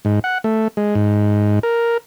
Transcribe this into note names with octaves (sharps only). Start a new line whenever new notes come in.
G#2
F#5
A3
G#3
G#2
A#4